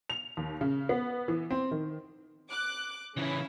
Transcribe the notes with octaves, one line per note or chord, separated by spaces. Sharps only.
F7
D#2
C#3
B3
E3
C4
D#3
D6 F#6
C#3 E3 C#4 E4 F5